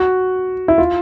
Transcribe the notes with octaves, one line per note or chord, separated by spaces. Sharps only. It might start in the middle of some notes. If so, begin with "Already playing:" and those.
Already playing: F#4
E4
F4